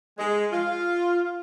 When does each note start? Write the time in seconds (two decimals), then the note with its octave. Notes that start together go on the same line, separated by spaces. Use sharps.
0.18 G#3
0.52 F4